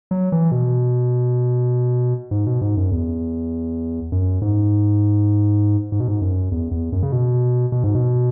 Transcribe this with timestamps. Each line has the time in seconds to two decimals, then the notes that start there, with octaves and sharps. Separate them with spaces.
0.11 F#3
0.32 E3
0.52 B2
2.31 G#2
2.46 B2
2.61 G#2
2.77 F#2
2.92 E2
4.12 F#2
4.42 G#2
5.92 G#2
6.00 B2
6.08 G#2
6.22 F#2
6.52 E2
6.71 E2
6.92 F#2
7.03 C#3
7.12 B2
7.72 B2
7.84 G#2
7.95 B2